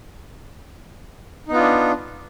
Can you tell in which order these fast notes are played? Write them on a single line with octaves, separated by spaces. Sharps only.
D#4 B3 F4 D4